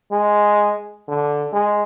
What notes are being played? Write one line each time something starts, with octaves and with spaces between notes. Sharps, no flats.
G#3
D3
G#3